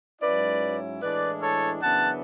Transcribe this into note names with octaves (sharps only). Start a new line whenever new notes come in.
G#2 F#3 C#4 E4 B4 D5
A2 E3 G#3 D4 B4 D5
A4 C#5
F#2 C#3 E3 B3 D4 F#5 A5